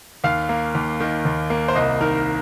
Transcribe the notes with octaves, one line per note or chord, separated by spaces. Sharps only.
D#2 F5
A#3
D#2
D#3
D#2
A#3
C5
C2 D#5
D#3 A#4